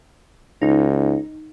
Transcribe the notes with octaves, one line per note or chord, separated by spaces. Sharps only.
C#2 D#4